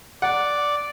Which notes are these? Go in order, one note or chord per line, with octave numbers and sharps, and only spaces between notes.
D5 F#5